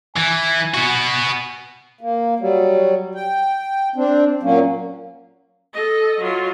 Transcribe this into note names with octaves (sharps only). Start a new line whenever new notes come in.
E3 G#5
B3 F#4
A#3
F#3 G3
G5
C4 D4
A#2 F#3 A#3 C#4
A4 D#5
F#3 F4